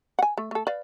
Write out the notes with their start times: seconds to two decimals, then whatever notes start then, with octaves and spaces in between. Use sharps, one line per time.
0.19 F#5 G#5
0.38 A3
0.51 A3 A4
0.67 B4 D5 F5